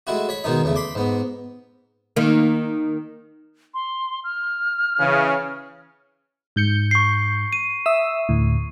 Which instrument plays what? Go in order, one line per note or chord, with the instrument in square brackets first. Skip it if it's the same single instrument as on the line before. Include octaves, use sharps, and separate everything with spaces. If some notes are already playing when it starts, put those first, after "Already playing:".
[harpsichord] G#3 A3 E4 F#4
C#5 B5
B2 D#3 G#3 D#4
E2 C#3 A3
B5 C6 D6
G#2 B3
[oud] D#3 A#3
[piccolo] C6
F6
[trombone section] C#3 E3
[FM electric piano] G#2 G6 C#7
[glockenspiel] C#6 C7
D#7
[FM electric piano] E5 D#6 E6
D2 A2